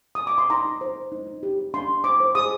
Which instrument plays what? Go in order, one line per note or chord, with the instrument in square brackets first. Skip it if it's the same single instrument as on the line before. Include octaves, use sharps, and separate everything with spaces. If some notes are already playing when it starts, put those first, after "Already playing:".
[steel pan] D#6
D6
C6
D#4 A#5
D#4
C5
C5
D#4
D#4
G4
G4
D4 C6
D4
C5 D6
C5
G#4 D#6